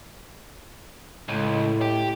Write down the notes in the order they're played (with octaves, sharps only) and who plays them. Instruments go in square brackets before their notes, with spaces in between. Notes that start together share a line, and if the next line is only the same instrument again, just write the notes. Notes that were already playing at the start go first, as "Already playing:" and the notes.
[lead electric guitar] C#2 [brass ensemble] A2
[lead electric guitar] G4